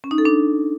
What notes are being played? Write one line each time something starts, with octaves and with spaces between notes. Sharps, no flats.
C#4
D#4
A4
D4